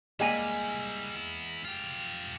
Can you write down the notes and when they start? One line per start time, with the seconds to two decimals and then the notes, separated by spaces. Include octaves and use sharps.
0.20 G3 G#3 A#3 E4 G#5
1.15 B3 E4
1.65 F4 G4